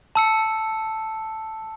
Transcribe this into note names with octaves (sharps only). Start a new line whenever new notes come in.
A5 E6 C#7